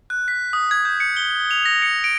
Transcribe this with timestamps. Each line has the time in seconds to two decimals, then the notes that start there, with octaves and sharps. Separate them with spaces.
0.10 F#6
0.28 B6
0.53 D#6
0.71 G#6
0.85 G6
1.00 C#7
1.17 G7
1.51 F7
1.66 A#6
1.82 C#7
2.04 D7